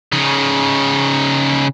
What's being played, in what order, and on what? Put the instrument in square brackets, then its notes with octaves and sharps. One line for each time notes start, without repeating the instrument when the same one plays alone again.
[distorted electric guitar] C#3 D#4